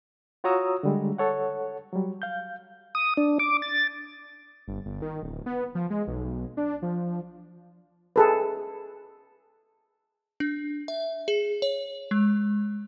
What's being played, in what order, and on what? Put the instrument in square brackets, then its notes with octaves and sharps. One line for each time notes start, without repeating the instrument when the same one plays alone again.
[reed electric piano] F4 F#4 C#5 A#5 D#6 E6
D3 G3 G#3
A4 C#5 F#5
F#3 G3
F5 G6
[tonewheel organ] D#6
D4
D6
A6
[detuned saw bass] G1
G1
D#3
D1
B3
F3
G#3
B1
D4
F3
[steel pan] G#4 A4 B4
[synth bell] D4
E5
G#4
C#5
G#3